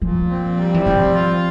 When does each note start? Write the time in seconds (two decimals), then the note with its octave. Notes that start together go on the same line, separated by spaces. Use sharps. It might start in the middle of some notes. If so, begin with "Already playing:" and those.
0.01 A#2 F3
0.30 C4
0.57 G3
0.74 E3
0.86 F3 C4
1.14 F4